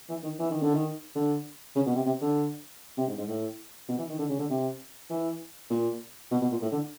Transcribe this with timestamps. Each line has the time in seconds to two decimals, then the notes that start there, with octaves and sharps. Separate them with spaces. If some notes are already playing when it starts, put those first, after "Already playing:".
0.09 E3
0.23 D#3
0.39 E3
0.50 D#3
0.62 D3
0.74 D#3
1.15 D3
1.75 C#3
1.86 B2
1.95 C3
2.06 C3
2.21 D3
2.97 C3
3.07 G#2
3.18 G#2
3.28 A2
3.89 B2
3.98 E3
4.09 D#3
4.19 D3
4.29 C#3
4.39 D3
4.49 C3
5.10 E3
5.70 A#2
6.31 B2
6.41 B2
6.52 A#2
6.62 A2
6.72 D3